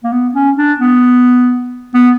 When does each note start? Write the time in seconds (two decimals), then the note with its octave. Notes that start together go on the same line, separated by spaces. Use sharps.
0.04 A#3
0.12 B3
0.35 C#4
0.58 D4
0.80 B3
1.94 B3